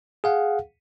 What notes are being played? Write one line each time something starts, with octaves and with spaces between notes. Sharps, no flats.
G#4 F5 F#5